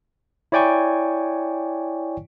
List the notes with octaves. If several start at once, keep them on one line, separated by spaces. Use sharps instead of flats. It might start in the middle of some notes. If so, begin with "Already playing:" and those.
E4 C#5 D5 G5 G#5 C#6